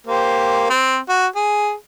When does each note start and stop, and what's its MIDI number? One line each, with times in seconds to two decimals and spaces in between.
0.07 0.69 58
0.07 0.69 67
0.07 0.69 72
0.70 0.98 60
1.09 1.26 66
1.36 1.73 68